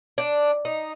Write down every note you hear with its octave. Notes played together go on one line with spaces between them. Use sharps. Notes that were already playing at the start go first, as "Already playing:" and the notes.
D4
D#4